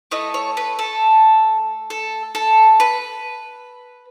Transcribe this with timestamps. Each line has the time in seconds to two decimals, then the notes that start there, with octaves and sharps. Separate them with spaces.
0.11 A3 E4 A4 D#5
0.34 C#5
0.57 B4
0.79 A4
1.90 A4
2.35 A4
2.80 B4